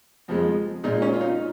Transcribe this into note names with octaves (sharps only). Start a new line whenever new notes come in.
F2 F3 G#3
A#2 G#3 D#4
C#4
F4
D#4